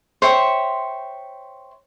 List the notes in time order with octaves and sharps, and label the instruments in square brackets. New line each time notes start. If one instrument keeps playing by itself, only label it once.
[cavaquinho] C5 C#5 E5 G5